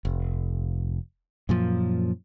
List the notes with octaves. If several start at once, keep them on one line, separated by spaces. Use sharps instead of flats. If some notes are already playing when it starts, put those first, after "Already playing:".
F1
F#2 A#2 F3